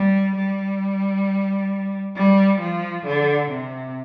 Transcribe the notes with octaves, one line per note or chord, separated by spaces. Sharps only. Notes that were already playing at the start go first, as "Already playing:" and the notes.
Already playing: G3
G3
G3
F3
D3
C3